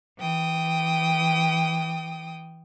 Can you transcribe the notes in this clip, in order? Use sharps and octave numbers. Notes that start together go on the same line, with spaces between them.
E3 G5 D#6